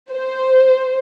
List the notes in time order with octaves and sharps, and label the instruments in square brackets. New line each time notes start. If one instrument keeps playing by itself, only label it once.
[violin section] C5